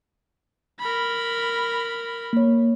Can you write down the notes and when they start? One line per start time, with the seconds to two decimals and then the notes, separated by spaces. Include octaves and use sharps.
0.80 A#4 B5
2.33 A#3 C#5